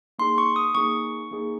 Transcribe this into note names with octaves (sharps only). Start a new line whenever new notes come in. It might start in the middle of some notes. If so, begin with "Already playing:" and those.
A#3 D#4 G#4 C6
C#6
D#6
A#3 D#4 G#4 C#6
A#3 D#4 G#4